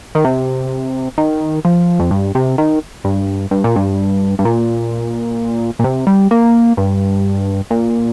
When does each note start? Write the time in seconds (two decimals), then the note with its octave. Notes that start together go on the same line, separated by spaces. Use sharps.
0.15 D#3
0.25 C3
1.18 D#3
1.65 F3
2.00 F2
2.11 G2
2.35 C3
2.58 D#3
3.04 G2
3.51 G2
3.64 A#2
3.76 G2
4.39 G2
4.45 A#2
5.79 A#2
5.84 C3
6.07 G3
6.31 A#3
6.77 G2
7.71 A#2